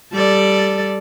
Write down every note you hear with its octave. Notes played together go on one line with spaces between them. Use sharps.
G3 A4 D5